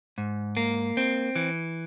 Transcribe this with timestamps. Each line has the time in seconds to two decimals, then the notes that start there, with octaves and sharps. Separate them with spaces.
0.18 G#2
0.57 A#3
0.97 C4
1.36 E3